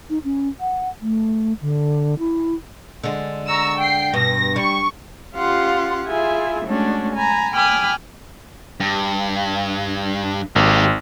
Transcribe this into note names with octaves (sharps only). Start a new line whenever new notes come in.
D#4
C#4
F#5
A3
D3
E4
D3 G#3
A#5 C#6 E6
G5 C7
G2 B2 A#6
G3 C#6
C#4 F4 G4 F5 F#5 C6
E4 F4 G#4 E5 G#5
G#3 A3 C#4 D4 F#4
G#5 A#5 B5
G5 G#5 B5 D6 D#6 F6
G2
G#1 A#3 G4